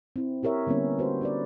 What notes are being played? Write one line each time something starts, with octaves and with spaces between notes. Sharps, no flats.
C4 E4
E4 G4 A#4 C#5 E5
D3 G3 A#3 B3 C#4
F#4 B4 C5
D4 B4 D5